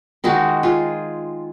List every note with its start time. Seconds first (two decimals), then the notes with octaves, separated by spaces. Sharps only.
0.24 D#3 G#3 D#4 F#4
0.63 F4 G#4